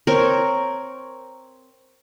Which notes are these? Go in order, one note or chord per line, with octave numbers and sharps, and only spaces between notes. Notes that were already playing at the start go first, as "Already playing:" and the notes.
C4 A#4 C#5